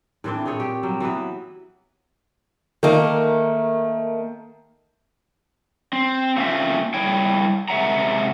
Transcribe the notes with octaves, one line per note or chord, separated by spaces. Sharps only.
A2 E3 C4 D4
A#2 C4 G#4 C#5
G4
F#3 G3
E3 F#3 B3 B4
D#3 A3 A#3
C4
A3 A#3 C4 C#4 F4 E5
G3 E4 C#5 G5
C3 G#3 E5 F#5 A#5